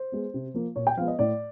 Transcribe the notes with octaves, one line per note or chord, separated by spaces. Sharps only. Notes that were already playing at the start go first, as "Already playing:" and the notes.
Already playing: C5
G#3 B3
C3
F3 A#3
A#2 C#5
G5
F3 G#3 B3 F5
D#5
A2 D5